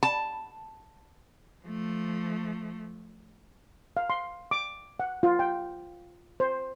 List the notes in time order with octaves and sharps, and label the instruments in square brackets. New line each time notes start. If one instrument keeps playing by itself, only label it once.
[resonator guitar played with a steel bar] A5
[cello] F3 A3
[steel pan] F5
C6
D6
F#5
F4
G5
C5